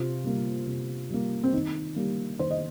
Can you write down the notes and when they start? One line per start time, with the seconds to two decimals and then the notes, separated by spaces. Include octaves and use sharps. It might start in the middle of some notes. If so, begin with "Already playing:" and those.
Already playing: C3 F4
0.24 G3 A#3
0.67 C3
1.10 G3 A#3
1.43 C4
1.53 D#3 D#4
1.96 G3 A#3
2.39 D#3 C5
2.50 D#5